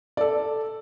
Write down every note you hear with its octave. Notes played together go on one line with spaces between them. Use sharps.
A4 D5